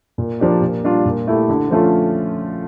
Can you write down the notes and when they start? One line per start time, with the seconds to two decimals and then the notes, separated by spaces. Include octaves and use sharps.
0.18 A#2
0.40 F3 A#3 D4 G4
0.62 A#2
0.84 G3 D4 F4
1.06 A#2
1.27 A3 E4 G4
1.49 D3
1.70 F3 A3 C#4 F4